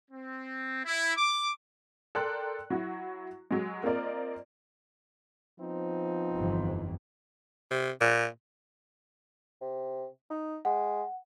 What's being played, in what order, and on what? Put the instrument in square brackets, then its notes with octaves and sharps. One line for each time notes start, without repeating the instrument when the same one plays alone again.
[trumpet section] C4
E4
D6
[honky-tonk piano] A4 A#4 D5 G5 C6 F#6
F#3 E4 F#4
F#3 G#3
A#3 C4 F4 A#4 D5 D#5
[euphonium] F3 [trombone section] B3 C4 D#4
[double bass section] G1 F2 E3
[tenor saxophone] C3
A#2
[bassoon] C3
D#4
[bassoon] G#3 [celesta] F#5